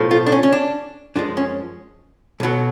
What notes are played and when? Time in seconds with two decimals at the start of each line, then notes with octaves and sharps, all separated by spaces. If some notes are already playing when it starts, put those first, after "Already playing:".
Already playing: B1 A2 F3
0.11 F4
0.26 D4
0.32 C#4
0.43 C#4
0.52 D4
1.16 F#2 F3 G#3 D4
1.37 C#4
2.40 B1 B2 F#3